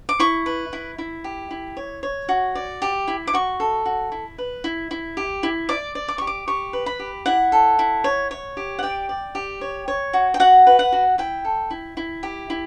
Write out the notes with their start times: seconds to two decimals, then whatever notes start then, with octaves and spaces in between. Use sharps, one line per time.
0.09 D6
0.20 E4 C#6
0.46 B4
0.73 E4
0.98 E4
1.24 G4
1.51 E4
1.77 C#5
2.03 C#5
2.29 F#4
2.55 D5
2.82 G4
3.07 E4
3.27 D6
3.34 F#4 C#6
3.60 A4
3.85 F#4
4.12 E4
4.38 B4
4.64 E4
4.91 E4
5.17 G4
5.43 E4
5.69 D5 D6
5.95 D5
6.08 D6
6.18 G4 C#6
6.27 D6
6.47 G4 C#6
6.73 B4
6.86 B5
6.99 G4
7.26 E4 F#5
7.52 A4
7.79 E4
8.04 C#5
8.31 C#5
8.57 G4
8.79 F#5
8.83 D5 G5
9.09 D5
9.35 G4
9.61 C#5
9.88 C#5
10.13 F#4
10.34 G5
10.40 F#4 F#5
10.67 B4
10.79 F#5
10.92 F#4
11.18 E4 G5
11.45 A4
11.71 E4
11.97 E4
12.23 G4
12.50 E4